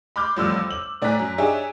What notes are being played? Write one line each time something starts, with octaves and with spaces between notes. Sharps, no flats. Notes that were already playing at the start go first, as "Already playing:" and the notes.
B5 C6 D6 F6 G6
A1 F2 G3 E6 F6
F#7
A2 D5 G#5 A#5 F#6 B6
F#2
D4 D#4 G4 G#4 C#5 E5